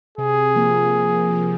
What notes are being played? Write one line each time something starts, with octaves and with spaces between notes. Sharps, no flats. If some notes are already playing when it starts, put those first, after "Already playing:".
C3 G#4
F3 A#3
C3
F3 A#3